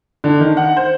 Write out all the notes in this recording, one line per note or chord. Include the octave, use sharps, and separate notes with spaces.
D3
D#3
F#5
C5